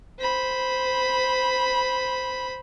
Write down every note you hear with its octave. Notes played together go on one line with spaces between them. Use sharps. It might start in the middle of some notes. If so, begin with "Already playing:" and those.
C5 B5